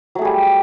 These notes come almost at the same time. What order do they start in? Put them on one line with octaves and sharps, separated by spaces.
F#3 A3 G#4 G3